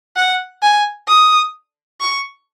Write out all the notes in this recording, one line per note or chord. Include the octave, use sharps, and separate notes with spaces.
F#5
G#5
D#6
C#6